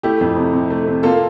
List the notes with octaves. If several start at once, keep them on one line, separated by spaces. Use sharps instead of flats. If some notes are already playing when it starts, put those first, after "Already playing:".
A3 E4 G4
F2
C3
C3
A3
C3
A#3 F4 A4